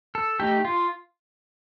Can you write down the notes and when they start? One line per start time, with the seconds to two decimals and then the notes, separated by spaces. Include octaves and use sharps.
0.15 A4
0.40 A3 D#4 G4
0.65 F4